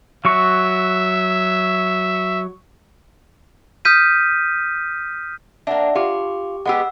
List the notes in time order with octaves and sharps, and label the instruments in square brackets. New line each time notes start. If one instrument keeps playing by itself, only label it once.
[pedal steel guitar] F#3 F#4 C#6 [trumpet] E5
[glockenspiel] D#6 F6 G6 B6 D#7
[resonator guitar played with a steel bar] A#3 D4 [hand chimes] E5 F#5
[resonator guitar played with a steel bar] F4 [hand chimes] G4 D6
[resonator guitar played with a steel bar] G#3 B3 G4 [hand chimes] F#5 E6